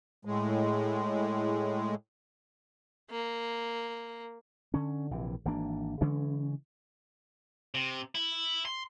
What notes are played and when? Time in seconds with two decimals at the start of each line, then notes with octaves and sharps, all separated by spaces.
0.25 A2 G#3
3.11 A#3
4.74 D3 C#4
5.11 A#1 C3 E3
5.45 G#1 E3 A#3 D4
6.01 C#3 E3 G#3 C#4
7.75 C3
8.15 E4
8.66 C6